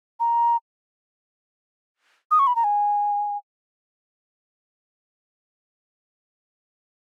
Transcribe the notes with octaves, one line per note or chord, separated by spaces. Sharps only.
A#5
D#6
C#6
B5
A#5
G#5